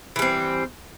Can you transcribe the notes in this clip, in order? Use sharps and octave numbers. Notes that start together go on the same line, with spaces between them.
E3 G3 C4